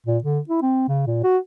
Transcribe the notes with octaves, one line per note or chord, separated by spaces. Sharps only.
A#2
D3
E4
C4
C#3
A#2
F#4